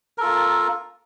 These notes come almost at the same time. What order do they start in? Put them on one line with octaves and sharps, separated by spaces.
A#4 A4 F4 A#3